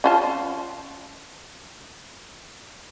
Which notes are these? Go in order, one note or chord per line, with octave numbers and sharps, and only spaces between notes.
C#4 F4 A5